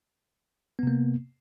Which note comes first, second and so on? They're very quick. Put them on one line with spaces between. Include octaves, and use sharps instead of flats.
B3 C3 A#3